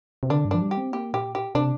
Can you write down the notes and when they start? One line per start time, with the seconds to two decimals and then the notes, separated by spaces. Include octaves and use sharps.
0.23 C3
0.30 D3 D4
0.45 G2
0.51 F3 D4
0.62 G3
0.71 G4
0.78 C4
0.92 A#3 G4
1.14 A#2 G4
1.35 G4
1.55 C3 D4